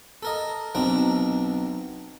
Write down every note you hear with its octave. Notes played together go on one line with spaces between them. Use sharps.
A4 A#4 D#5
B1 B2 C4 D4 A#4